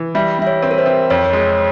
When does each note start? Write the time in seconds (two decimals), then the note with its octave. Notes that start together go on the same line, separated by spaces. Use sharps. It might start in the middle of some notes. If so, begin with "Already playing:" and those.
Already playing: E3
0.15 G3 E5
0.39 G3 E5
0.47 C#5
0.62 C4
0.71 A#4
0.78 C5
0.86 C4
1.10 F2 C#5
1.33 G#3